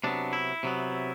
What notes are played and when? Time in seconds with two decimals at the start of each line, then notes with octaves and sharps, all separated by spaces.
0.04 C3 F#3 B3 D4
0.33 E4
0.63 C3 F#3 B3